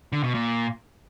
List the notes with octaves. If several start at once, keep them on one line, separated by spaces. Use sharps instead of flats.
D3
B2
A#2